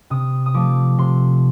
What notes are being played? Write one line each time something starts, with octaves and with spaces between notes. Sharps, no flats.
C3 D#6
D#6
F3 A3 D6
C3 C6